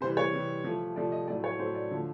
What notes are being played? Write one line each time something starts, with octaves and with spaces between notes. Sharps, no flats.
C3 E3 G3 C5
C#5
C3 E3 G3
C3 F3 A3
C3 F3 A3 D5
D#5
A2 F#3 A3 D5
C#5
A2 F#3 A3 C5
D5
D3 F3 A3